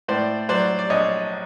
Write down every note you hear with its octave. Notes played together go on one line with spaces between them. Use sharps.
A2 C5 D5
F#3 C5 D5
D5
A#1 C#5 D#5